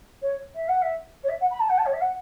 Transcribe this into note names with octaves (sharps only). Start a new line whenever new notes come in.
C#5
E5
F#5
E5
C#5
E5
F#5
B5
A5
F#5
A5
C#5
E5
F#5